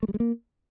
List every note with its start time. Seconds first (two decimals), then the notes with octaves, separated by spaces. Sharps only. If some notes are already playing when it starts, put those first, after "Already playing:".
0.03 A3
0.08 G3
0.14 G#3
0.20 A#3